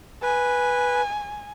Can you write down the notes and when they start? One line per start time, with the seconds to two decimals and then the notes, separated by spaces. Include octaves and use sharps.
0.23 B4 G#5